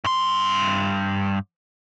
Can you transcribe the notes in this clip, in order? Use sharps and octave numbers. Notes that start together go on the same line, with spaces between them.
G2 C6